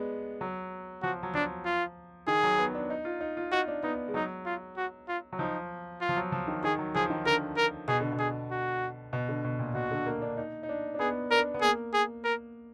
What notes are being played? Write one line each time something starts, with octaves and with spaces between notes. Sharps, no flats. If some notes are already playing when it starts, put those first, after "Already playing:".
Already playing: G#3 B3 D4
F#3
F3 F#4
F#3
F3 D4
F4
D#3 G#4
F#3
B3
D4
D#4
F4
D#4
F4
D#4 F#4
D4
B3 D#4
G#3
F#3 D#4
F4
F#4
F4
F#3
F3 D#4
F4
F3
F#3
F3
D#3
D#3 G#4
F#3
F3 G#4
D#3
D3 A#4
A#4
B2 G#4
D3
B2
G#4
F#4
B2
D3
B2
A#2
B2 F#4
D3
A#3
D4
D#4
D#4
D4
D4
B3 G#4
D4 A#4
B3
A#3 G#4
G#4
A#4